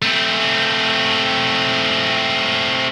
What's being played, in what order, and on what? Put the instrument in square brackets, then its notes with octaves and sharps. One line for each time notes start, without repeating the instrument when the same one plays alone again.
[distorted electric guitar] A3 C4